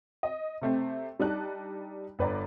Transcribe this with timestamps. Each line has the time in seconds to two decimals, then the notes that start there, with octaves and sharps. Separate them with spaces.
0.23 D#5
0.61 C3 A3 C4
1.19 G3 D4 D#4 D5 A5 F#6
2.19 G1 B4 D5 A#5